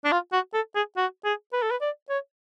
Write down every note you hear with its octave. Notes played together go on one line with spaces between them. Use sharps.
D4
F4
F#4
A4
G#4
F#4
G#4
B4
A4
B4
D5
C#5